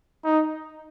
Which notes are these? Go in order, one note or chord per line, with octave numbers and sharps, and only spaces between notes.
D#4